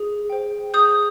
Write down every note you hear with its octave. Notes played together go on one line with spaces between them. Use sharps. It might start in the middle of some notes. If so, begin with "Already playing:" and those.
Already playing: G#4
C5 G5
G#4 D#6 G6